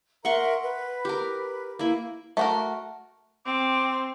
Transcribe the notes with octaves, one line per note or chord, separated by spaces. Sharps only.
A#4 E5 F#5 A#5 C6 C#6
B4
G4 A#4
A#3 E4
A3 F#4 A#4
C4 D6